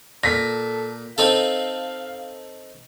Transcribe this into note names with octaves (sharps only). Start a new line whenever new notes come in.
A#2 A4 A#6 B6
C4 D#4 A4 F5